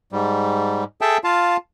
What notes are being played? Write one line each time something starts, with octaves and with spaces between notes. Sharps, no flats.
G#2 G3
G#4 A4 E5 G5 A5
F4 F5 A5